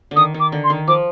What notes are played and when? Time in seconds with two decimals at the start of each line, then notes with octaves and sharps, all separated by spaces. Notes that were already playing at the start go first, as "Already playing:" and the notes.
0.11 D3
0.16 D#3 D#6
0.34 D#3
0.40 D6
0.52 D3
0.64 C6
0.70 D#3
0.88 F3 D6